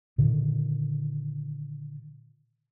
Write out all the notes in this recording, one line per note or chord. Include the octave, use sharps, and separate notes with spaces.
A#2 D3 D#3